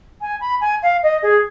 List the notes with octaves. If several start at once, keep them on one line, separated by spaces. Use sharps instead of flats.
G#5
B5
G#5
F5
D#5
G#4